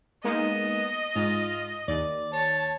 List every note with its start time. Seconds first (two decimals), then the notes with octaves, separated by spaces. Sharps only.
0.24 G#3 A#3 B3 D#4 D#5
1.16 G#2 F4
1.88 D#2 D5
2.33 C#5 A5